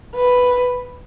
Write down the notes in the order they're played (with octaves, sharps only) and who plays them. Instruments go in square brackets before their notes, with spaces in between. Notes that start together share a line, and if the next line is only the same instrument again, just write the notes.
[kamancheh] B4